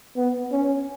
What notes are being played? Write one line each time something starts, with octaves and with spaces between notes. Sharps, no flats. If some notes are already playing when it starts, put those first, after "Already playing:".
B3
C#4